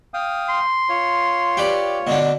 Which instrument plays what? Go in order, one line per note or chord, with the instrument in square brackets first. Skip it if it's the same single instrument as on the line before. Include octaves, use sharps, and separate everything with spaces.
[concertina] F5 G5 D#6
[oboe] C6
[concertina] F4 C#5
[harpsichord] G4 B4 D5
B2 D3 D4